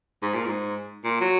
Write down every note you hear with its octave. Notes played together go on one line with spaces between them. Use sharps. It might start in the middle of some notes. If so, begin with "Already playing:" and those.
G#2
A#2
G#2
A#2
F#3